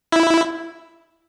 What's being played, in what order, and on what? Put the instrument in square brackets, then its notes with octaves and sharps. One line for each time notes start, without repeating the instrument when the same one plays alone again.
[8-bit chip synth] E4